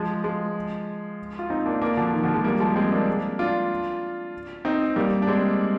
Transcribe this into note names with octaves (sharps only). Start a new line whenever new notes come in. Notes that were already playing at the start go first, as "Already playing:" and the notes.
Already playing: F3 G#3
F3 G#3
F4
C4 D#4
A#3 D4
A#3 D4
D3 F3
D#3
D3 F3
F3 G#3
G3 A#3
F3 G#3
G#3 C4
A#3 D4
D4 F4
C4 D#4
G3 A#3
D4
G#3 C4